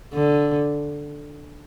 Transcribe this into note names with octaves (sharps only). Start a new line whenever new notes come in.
D3